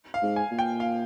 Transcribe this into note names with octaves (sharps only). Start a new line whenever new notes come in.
F5
G#2
G#5
A#2
G5
F5